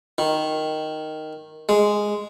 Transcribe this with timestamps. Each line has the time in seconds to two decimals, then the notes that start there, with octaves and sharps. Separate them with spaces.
0.18 D#3
1.69 G#3